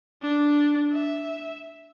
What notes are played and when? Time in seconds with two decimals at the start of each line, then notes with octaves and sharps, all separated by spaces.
0.22 D4
0.93 E5